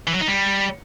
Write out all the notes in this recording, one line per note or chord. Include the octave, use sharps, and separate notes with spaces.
E3
F#3
D#4
G3